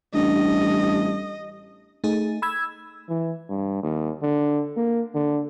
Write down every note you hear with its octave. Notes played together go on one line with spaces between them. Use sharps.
A1 G3 D4 D#5
A3 D#4 G#4
B5 E6 G#6
E3
G2
D#2
D3
A#3
D3